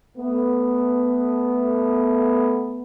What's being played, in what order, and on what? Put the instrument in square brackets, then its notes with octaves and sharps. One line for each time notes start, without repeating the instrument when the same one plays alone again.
[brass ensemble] A3 B3